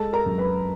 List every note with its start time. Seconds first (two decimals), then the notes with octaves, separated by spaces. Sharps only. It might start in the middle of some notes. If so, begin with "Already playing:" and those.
Already playing: G#3 A4 A5
0.13 A#4 A#5
0.26 F#2
0.38 B4 B5